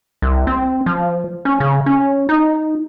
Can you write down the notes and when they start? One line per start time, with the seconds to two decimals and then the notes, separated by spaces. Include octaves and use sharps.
0.22 C2
0.47 C4
0.86 F3
1.45 C#4
1.60 C#3
1.86 C#4
2.29 D#4